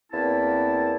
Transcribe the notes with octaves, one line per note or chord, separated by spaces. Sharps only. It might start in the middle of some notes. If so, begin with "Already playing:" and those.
E2 A#3 C4 E4 A5